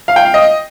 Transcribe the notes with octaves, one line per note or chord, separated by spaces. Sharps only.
F5
G5
F5
D#5